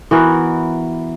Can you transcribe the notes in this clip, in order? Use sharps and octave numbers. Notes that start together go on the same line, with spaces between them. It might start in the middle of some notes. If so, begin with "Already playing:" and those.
E3 B3 F#4 A#4